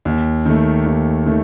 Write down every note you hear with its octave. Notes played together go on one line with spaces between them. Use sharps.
D#2
D#3 A3
D#2
D#3 A3